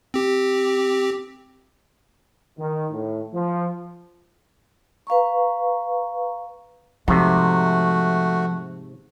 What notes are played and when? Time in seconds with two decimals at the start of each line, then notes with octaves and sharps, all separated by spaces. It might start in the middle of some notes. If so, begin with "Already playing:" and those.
0.14 C4 G4
2.58 D#3
2.92 A2
3.34 F3
5.07 B4 F5 A#5 C#6
7.08 G#2 C3 F3 A3 F#4